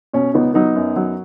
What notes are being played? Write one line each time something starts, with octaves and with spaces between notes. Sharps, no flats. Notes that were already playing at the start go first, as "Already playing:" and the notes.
B2 C#4
C#2 B3 D#4
F#3 B3 D#4
F#2
F#3